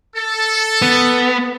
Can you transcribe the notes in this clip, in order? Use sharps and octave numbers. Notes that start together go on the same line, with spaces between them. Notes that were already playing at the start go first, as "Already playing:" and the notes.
A4
B3